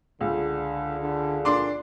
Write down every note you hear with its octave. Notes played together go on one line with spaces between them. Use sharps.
C#2 D3
D3
A#2 D4 C6 D6